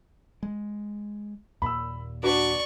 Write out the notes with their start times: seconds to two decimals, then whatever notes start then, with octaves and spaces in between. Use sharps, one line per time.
0.43 G#3
1.62 D#2 A#2 B5 E6
2.23 D4 F#4 B4 D5 C#6